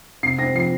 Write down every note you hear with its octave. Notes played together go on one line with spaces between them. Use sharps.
C3 C7
C4 A#6
F3 C7